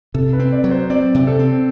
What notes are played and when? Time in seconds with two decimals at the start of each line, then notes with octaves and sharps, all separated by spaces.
0.14 C3 A4
0.33 B4
0.39 C4
0.52 D5
0.64 F#3
0.71 C5
0.90 C4 D5
1.14 C3
1.27 A4
1.39 C4